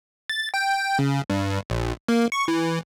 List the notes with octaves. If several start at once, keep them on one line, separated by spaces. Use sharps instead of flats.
A6
G5
C#3
G2
A#1
A#3
C#6
E3